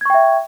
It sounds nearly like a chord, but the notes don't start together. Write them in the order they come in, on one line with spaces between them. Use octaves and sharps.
G#6 C#6 G5 E5